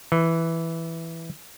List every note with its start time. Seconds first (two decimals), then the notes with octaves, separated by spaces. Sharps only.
0.12 E3